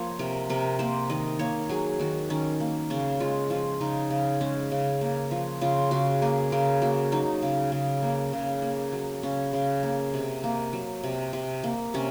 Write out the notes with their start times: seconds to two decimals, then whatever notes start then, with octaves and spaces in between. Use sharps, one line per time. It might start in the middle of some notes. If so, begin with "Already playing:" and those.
Already playing: F3 A#3 C#5
0.19 C3 A#4
0.50 C3 A#4
0.79 A#3 C5
1.10 D#3 D#5
1.39 A#3 C#5
1.69 F#3 G#4
1.99 D#3 F#4
2.30 D#3 C#4
2.60 A#3
2.90 C#3 C#4
3.20 G#3 F4
3.50 F3 F4
3.81 C#3 D#4
4.10 C#3
4.41 G#3 C#4
4.72 C#3
5.01 A#3
5.31 F3
5.61 C#3 F4
5.91 C#3 F#4
6.22 A#3 G#4
6.52 C#3 A#4
6.82 A#3 F#4
7.12 F#3 D#4
7.42 C#3
7.72 C#3
8.03 A#3
8.33 C#3
8.62 A#3
8.93 F#3
9.23 C#3 C#4
9.53 C#3
9.83 A#3
10.14 C3
10.44 A#3
10.73 F#3
11.04 C3
11.33 C3
11.64 A#3
11.94 C3 C#4